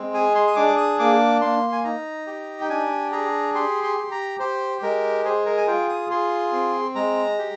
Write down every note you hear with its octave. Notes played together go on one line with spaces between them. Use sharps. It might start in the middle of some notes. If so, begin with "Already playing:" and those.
Already playing: G#3 C4
G#4 G#5
C6
D#6
D4 D6
D#6
A#3 D6
A#3 C6
G#5
D#4 A#5
G4
G5
D4 G#5
G#4 A#5
G4 C6
C6
G4
A#5
G4 C5
G#3 A#4
G#4 C5
A#4
G#5
F4 G5
D#6
G#4 C6
C4
G#3 A#5
G4